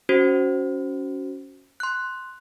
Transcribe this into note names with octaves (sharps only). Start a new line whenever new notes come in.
C#4 F#4 C5
C6 F#6